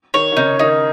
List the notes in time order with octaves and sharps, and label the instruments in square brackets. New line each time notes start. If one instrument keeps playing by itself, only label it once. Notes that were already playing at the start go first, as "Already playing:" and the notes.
[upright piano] D#3 [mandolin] C#5
[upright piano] D#3
[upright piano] C#3 [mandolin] D#4
[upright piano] D#3 [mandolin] D#4